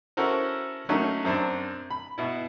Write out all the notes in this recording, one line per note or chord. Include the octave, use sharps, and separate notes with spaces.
C#4 E4 F#4 A4 A#4 C5
F#3 A3 A#3 C#4 D#4
F#2 C4 D4
B5
B2 E4